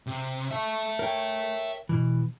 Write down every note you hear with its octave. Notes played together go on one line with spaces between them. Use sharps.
C3
E5 A5
A#4 C#5 G5
B2 E3